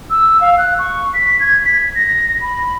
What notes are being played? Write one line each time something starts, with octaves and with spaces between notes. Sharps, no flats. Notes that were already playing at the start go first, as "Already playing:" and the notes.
E6
F5
F#6
C#6
B6
G#6
B6
A#6
B5